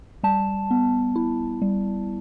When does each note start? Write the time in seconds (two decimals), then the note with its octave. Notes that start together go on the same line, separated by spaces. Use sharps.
0.23 G3 A5
0.71 B3
1.16 E4
1.62 G3